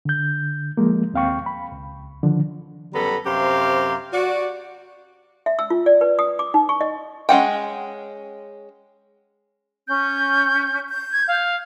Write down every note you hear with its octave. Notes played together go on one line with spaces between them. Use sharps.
D3 G6
F3 G#3 A#3
D#2 C4 F5 G5 C#6
B5
C#2
D3 D#3 F3
F#2 G3 B3 A4 A#5 B5
F#2 C3 G4 C5 F5 A#5
F#4 D5
E5
E6
F4
D5
B4
D#6
D6
D#4
C#6
D#5
G#3 C#4 F#5 G5
C#4 G6
G6
G#6
F5